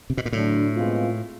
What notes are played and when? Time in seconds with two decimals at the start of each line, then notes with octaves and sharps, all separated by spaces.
0.10 C3
0.17 B2
0.25 A#2
0.32 A2 D3 F#3 A3 D4
0.74 B2 G#3 C4 F4